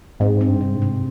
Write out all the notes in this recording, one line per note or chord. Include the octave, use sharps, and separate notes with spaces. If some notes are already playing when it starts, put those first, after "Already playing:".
G#2 C4
C4
G2
C3
G#2
C3